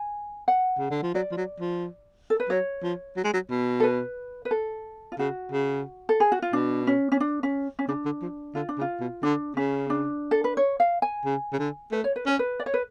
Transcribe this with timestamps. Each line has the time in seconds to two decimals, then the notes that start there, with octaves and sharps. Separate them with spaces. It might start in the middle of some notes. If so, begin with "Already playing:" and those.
Already playing: G#5
0.48 F#5
0.78 C#3
0.91 D3
1.03 F3
1.14 F#3 D5
1.32 F3
1.37 F#3
1.60 F3
2.30 A4
2.40 B4
2.49 F#3 C#5
2.83 F3
3.17 F#3
3.24 G#3
3.33 F#3
3.50 B2
3.80 A4
3.83 B4
4.45 B4
4.51 A4
5.12 F4
5.19 C#3 F#4
5.52 C#3
6.09 A4
6.20 G#4
6.32 F#4
6.42 F4
6.53 B2 D4
6.87 C#4
7.12 C#4
7.20 D4
7.43 C#4
7.79 C#4
7.88 C#3 D4
8.05 D3
8.22 F3
8.55 D3 F4
8.69 D4
8.78 C#3
8.81 F4
9.00 B2
9.23 D3 D4
9.57 C#3 C#4
9.90 D4
10.31 A4
10.44 B4
10.57 C#5
10.80 F5
11.02 G#5
11.25 C#3
11.52 C#3
11.59 D3
11.92 A3 B4
12.04 C#5
12.16 B4
12.26 C#4 C#5
12.39 B4
12.60 D5
12.66 C#5
12.74 B4